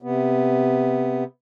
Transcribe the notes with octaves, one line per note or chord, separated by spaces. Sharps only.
C3 B3